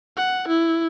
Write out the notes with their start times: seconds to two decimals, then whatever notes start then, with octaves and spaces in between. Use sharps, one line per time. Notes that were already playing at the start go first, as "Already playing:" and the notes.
0.17 F#5
0.48 E4